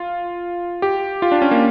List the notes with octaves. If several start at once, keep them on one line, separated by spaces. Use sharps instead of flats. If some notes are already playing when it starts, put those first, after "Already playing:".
Already playing: F4
G4
F4
D4
C#4
A#3